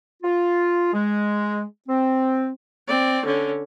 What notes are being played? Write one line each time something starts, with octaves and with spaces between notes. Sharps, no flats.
F4
G#3
C4
C4 D5
D3 C#4